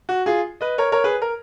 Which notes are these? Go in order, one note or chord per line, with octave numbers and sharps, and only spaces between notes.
F#4
F4 G#4
B4 D#5
A#4 C#5
A#4 C#5
G#4 B4
A#4